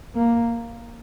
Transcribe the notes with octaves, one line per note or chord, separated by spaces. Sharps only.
A#3